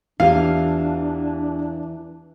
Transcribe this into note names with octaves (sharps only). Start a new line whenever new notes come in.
E2 E3 D4 F4 G4 F5